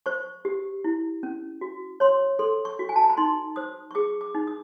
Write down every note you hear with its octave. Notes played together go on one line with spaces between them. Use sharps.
C5 C#6
G4
E4
C#4
F#4
C#5 C6
A4 C6
C#6
F#4
G#5
A5
A#5
B5
D#4 C6
C5 D#6
C#6
G#4 D6
D6
D#4
D#6